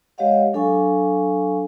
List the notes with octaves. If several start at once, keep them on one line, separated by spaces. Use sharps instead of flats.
G#3 G4 C#5 D#5 F5 F#5
F#3 D4 A4 F5 G#5 C#6